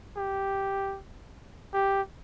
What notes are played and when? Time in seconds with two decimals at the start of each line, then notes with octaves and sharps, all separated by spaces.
0.16 G4
1.74 G4